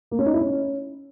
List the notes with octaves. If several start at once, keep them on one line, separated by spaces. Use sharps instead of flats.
A#3
C#4
D#4
E4
C#4